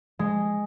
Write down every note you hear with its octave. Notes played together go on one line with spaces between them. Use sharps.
G#3